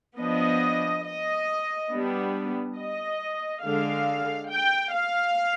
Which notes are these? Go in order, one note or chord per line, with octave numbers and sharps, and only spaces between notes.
F3 B3 D4 D#5
D#5
G3 B3 D4
D#5
D3 G#3 D4 F5
G5
F5